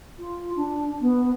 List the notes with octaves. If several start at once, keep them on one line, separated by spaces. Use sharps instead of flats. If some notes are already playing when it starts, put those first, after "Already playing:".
F4
D4
B3